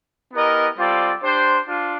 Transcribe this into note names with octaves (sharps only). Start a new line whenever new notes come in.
B3 E4 G4 A#4 D#5
G3 C4 F4 A4 D5
D4 G4 C5
D4 F4